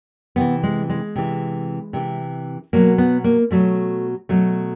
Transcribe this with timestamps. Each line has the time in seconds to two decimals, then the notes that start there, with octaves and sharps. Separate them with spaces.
0.36 C3 E3 B3
0.63 G#3
0.90 G#3
1.16 C3 E3
1.93 C3 E3
2.73 B2 F#3 A#3
2.98 B3
3.24 A#3
3.51 B2 F#3 A3
4.29 B2 F#3 A3